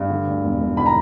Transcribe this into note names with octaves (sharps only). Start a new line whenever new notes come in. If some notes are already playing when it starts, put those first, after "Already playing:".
Already playing: G2
D3
D2
E1
E1
D3 B5
A#5